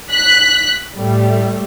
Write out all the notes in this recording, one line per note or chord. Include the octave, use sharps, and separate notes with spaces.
F#6 B6
A2 G3 A3